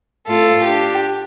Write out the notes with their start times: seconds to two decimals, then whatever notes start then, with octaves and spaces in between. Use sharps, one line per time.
0.27 A2 A3 C4 F4 A4
0.64 D4 G4